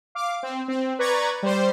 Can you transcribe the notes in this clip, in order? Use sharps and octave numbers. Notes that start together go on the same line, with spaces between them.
F5 D6
C4
C4
B4 D5 A#5 C#6 G#6 A6
G3 C5